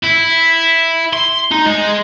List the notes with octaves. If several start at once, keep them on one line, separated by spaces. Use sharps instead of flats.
E4
C6
D#4
G#3